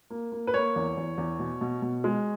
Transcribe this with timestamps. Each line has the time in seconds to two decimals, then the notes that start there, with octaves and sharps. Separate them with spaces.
0.10 A#3
0.32 A#3
0.47 B4
0.54 A#3 C#5
0.76 E2
0.97 E2
1.18 E2
1.39 B2
1.61 B2
1.82 B2
2.04 G#3